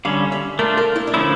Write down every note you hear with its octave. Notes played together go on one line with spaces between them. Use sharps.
D3 G3 C#4 F5
E5
A3 D4 F4 A#4
A#4
E4
D4
D3 F3 A3 C#4 E4